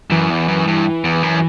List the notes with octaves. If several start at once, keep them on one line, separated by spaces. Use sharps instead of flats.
F#2 E3
E2
F#2
G2
E2
F#2